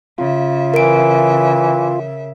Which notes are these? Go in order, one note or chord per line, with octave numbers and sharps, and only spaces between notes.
C#3 F4 E5
E3 A#4 D7